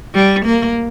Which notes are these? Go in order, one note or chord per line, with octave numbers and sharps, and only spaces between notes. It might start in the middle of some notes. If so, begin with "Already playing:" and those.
G3
A#3